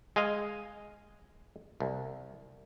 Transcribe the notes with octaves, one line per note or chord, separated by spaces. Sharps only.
G#3 D#5 F5 G#5
C2